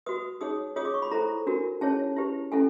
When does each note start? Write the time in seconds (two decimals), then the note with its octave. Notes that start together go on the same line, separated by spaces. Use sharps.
0.06 F#4 B4 D#6
0.41 D#4 G#4 C#5 D#6
0.76 F4 G#4 C#5 D#6
0.85 D6
0.94 C#6
1.02 B5
1.11 E4 A4 C5 A#5
1.47 D4 F#4 A#4
1.81 C#4 E4 G#4 C#5 A5
2.16 E4 G4 B4
2.52 C#4 E4 A4 G#5